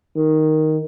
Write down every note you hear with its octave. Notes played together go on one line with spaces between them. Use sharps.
D#3